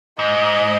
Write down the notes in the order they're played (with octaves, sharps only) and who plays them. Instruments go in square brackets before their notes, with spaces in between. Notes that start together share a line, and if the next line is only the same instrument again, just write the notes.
[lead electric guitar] G#2 [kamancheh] D#5